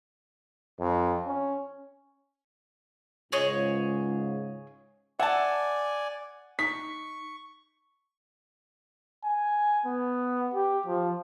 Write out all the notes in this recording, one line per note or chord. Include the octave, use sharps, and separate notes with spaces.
F2
C#4
C#2 G#2 C#3 G#4 C#5 D#5
D5 E5 F#5 G#5 A5
D#4 C#6 B6
G#5
B3
G4
F3